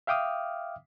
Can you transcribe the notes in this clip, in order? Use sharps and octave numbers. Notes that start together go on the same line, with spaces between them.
E5 F5 G5 D6 D#6 F6